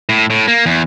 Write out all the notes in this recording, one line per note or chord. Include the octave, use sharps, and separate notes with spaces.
A2
A2
A#3
E2